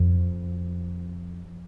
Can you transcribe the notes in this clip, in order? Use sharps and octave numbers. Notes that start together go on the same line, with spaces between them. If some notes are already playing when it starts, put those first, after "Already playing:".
Already playing: F2